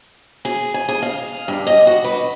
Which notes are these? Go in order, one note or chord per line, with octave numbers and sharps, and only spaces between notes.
G#4
G#5
G#4
F5
G2
D#5
F#4
B4